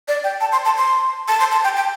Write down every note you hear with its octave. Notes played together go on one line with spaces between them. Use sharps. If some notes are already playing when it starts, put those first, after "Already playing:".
D5
G5
A5
C6
A5
C6
A5
C6
A5
G5
G5